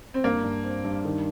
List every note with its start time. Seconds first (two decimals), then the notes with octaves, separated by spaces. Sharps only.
0.14 C4
0.24 G2 A#3
0.44 G2
0.64 C4
0.85 G2
1.05 D#3